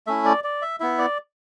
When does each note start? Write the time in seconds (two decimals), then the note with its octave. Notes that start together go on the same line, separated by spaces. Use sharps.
0.07 A3 C#4 E4 E5
0.25 D5
0.44 D5
0.62 E5
0.80 B3 E4 E5
0.98 D5